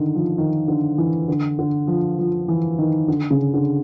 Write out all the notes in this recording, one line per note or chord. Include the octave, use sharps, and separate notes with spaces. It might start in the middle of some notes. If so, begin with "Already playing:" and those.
Already playing: D3 D#3
F3
D#3
D3
E3
D3
D3
F3
F3
E3
D#3
D3
C#3
D3